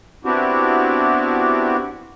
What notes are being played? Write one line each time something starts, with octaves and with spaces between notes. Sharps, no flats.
B3 C4 D4 E4 F#4 G4